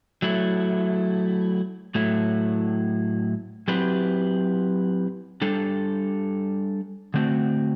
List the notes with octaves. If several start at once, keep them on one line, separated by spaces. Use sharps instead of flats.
F#3 A3 E4
A2 F#3 A3 E4
F#3 C4 E4 G4 B4
G3 D4 A4
D3 A3 C4 F#4